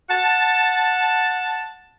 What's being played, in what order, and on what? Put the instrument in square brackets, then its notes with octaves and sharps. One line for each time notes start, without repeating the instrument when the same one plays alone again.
[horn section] F#5 A5